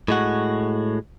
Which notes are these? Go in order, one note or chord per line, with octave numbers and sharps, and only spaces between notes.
A2 G#3 F#4